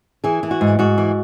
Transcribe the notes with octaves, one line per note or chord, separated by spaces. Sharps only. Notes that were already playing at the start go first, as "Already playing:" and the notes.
E3 G#4
E3
F#4
G#2
G#2 F#4
E3